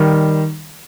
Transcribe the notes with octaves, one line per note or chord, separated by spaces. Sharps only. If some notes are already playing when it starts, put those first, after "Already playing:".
Already playing: D#3 G3